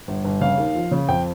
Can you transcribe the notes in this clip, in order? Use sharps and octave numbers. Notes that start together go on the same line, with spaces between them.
G1
G1
C#3 F5
D#2
F3
C#3
F2 G5